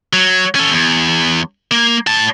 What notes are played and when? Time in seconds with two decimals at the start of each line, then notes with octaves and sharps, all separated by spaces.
0.13 F#3
0.55 C#4 A4
0.71 E2
1.71 A#3
2.07 A2 A5